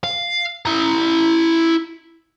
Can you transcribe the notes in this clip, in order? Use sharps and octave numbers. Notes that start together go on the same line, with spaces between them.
F5
E4 A#5